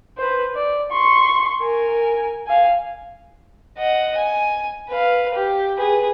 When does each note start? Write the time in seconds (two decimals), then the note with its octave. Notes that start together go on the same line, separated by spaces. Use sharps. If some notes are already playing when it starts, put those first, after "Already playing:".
0.17 B4 C5
0.54 D5
0.92 C6 C#6
1.60 A#4 G#5
2.48 F5 G#5
3.78 D#5 F#5
4.17 G#5
4.90 B4 F5
5.34 G4
5.78 G#4 B4